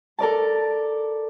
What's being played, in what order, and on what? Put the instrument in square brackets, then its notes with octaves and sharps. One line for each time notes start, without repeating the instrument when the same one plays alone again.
[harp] A4 A#4 D5 A5